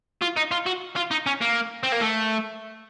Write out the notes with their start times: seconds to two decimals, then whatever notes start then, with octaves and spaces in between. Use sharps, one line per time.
0.21 F4
0.36 D#4
0.51 F4
0.66 F#4
0.96 F4
1.11 D#4
1.26 C#4
1.41 A#3
1.83 C4
1.92 A#3
2.01 A3